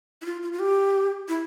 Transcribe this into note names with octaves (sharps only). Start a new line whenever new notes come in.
E4
F4
F4
F4
G4
E4